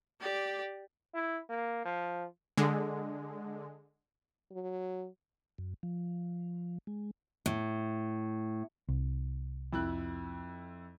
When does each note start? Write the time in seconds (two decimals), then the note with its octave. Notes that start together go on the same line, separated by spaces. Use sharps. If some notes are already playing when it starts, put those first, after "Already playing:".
0.20 G4 D5
1.14 E4
1.49 A#3
1.85 F3
2.57 D3 G#3
4.51 F#3
5.58 F#2
5.83 F3
6.87 G#3
7.46 A2
8.89 C2
9.73 F2 E4 F#6